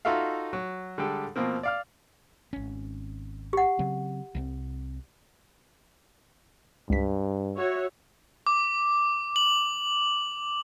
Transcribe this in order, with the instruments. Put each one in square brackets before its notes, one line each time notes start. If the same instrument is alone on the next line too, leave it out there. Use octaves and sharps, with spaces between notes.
[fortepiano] D#4 F4 F#4 A4 E5 F5
F#3
D3 G3 G#3 G4 A4
B2 F3 A#3 C4
D5 F5 F6
[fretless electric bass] G#1 C#4
[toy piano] G4 F#5
[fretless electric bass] C#3 F#3 C4
C2 G3 C4
[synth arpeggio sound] C#2 B6 [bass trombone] G2
[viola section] F#4 C#5 E5
[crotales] D6
F#7